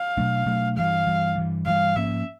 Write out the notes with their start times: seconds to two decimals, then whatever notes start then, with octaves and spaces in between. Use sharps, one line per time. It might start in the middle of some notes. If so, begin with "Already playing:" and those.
Already playing: F5
0.17 B2 F#3 A3 D4
0.46 B2 F#3 A3 D4
0.77 G2 E3 G3 F5
1.07 G2 E3 G3
1.36 G2 E3 G3
1.66 G2 E3 G3 F5
1.95 G#2 F3 A#3 C#4 E5